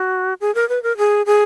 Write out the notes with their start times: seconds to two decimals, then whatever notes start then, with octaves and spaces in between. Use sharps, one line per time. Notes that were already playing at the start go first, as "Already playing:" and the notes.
Already playing: F#4
0.41 G#4
0.55 A#4
0.69 B4
0.83 A#4
0.97 G#4
1.26 G#4